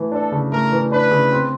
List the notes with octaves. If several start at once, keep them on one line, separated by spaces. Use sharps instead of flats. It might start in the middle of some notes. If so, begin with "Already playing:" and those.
Already playing: E3 A3
D4 A4
C#3
A3 A#4
E3
D4 B4
C#3
C4